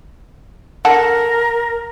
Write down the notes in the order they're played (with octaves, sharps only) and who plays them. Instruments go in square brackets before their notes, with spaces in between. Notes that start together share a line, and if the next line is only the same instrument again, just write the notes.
[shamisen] D3 A4 F#5 [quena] A#4